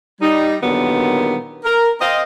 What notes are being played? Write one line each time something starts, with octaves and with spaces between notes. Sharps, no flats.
G3 D#4
A#2 D3 D#3 F#3 G3 B3
A#4
C4 D#5 F5